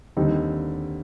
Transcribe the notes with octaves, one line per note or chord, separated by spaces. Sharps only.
D#2 D3 G3 C4 D#4